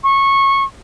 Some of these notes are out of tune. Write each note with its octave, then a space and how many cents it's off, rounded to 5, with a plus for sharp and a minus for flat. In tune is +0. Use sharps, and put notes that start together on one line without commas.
C#6 -20